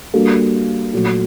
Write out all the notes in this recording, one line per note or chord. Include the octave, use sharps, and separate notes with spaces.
G3 A#3 D4 F#4 A4
A#2 F#3 A3